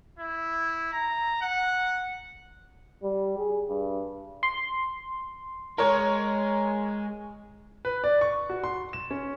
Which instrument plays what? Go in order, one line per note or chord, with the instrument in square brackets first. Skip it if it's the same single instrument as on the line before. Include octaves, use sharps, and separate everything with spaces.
[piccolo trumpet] E4
A#5
F#5
[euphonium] G3
G#4
G2
[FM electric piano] C6
[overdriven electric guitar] G#3 [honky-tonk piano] A#4 C#5
[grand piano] B4
D5
C#6
F#4
C6
E7
C#4